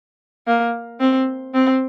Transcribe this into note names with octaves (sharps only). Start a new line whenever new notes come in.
A#3
C4
C4